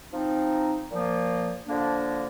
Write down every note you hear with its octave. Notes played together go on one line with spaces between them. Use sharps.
F3 C4 D#4
A#2 F3 A#3
D3 F3 A#3 D4